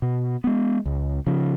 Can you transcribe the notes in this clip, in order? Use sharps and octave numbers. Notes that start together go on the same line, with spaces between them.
B2
G#3 B3
C#2
C#3 F3